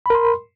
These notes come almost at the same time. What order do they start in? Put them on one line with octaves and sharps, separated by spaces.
B5 A#4 C6